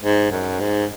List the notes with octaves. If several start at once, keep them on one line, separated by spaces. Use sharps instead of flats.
G#2
F#2
G#2